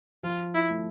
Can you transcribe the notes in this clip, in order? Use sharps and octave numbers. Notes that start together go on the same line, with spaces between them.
F3 F4
E4
A3